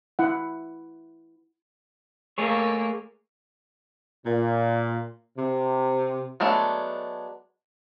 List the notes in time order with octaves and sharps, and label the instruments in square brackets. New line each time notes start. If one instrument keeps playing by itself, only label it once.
[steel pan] E4 F#5
[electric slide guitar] A3 G#4 C#5 [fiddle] A#3
[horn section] A#2
C3
[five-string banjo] F#3 G#3 A3 B3 D4